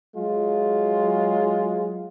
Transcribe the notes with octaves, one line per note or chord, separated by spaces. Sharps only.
F#3 G#3 F4